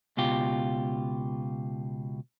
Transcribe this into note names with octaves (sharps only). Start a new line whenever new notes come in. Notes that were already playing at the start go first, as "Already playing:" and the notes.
C#2 B2 F4 G4